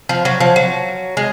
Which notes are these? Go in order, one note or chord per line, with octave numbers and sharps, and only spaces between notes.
F3
F#3
F3
F#3
G#3